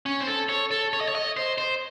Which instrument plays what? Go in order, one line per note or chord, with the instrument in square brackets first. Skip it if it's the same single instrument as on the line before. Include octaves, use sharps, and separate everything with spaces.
[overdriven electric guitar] C#4
C5
A4
C#5
A4
C#5
D#5
C#5
D#5
C5
C5